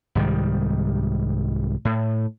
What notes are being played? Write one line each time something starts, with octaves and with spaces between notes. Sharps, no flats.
C2 G#2 D#3 G3
A2